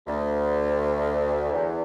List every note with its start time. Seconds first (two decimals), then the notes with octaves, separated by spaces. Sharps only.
0.06 D2
1.53 E2